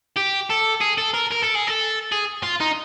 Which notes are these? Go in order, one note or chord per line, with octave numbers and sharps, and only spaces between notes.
G4
A4
G#4
A4
A#4
A#4
A4
G#4
A4
G#4
F4
D#4